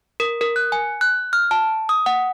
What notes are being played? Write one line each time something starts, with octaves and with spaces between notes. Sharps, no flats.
A#4
A#4
F#6
G#5
F#6
F6
A5
D#6
F#5